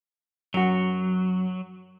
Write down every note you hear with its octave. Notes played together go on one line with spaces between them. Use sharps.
F#2 F#3 F#4